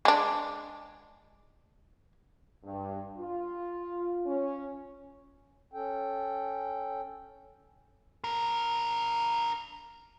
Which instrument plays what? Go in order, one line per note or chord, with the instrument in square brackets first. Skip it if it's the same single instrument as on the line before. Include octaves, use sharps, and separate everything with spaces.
[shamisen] G#3 D4
[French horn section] G2
F4
C#4
[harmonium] C#4 A4 G5
[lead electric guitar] D4 A#4